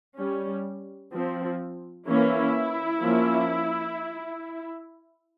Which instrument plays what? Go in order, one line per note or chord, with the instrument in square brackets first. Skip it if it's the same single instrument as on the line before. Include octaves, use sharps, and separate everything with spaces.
[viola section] G3 C#4
F3 C4
E3 A#3 C#4 E4
F3 A#3 C#4